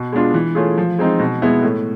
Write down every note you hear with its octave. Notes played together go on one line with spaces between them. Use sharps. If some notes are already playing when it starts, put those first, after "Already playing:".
Already playing: B2
G#3 B3 D4 F4
E3
A3 C#4 F4 G#4
F3
G#3 C4 D#4
B2
G#3 B3 E4
A2